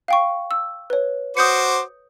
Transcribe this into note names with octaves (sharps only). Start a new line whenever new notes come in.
F5 G5 C#6
E6
B4 C#5
F#4 C5 D6 D#6 G6 C#7